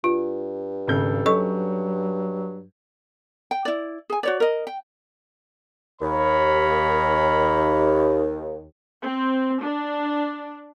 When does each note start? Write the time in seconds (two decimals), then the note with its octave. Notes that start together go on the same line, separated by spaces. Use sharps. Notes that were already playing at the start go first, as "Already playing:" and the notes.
0.04 G2 F4
0.87 G#1 C#3 A4 G6
1.26 F#3 C#4 A4 D#5 C#6
3.51 G5
3.65 E4 D5
4.10 G#4 G#5
4.23 F#4 C#5 D5
4.40 A#4 D#5
4.67 G5
6.02 D#2 A#4 C#5 B5
9.03 C4
9.62 D4